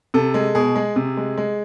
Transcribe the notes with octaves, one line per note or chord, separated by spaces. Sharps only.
C3 A4
G#3
B2 G#4
G#3
C3
G#3
G#3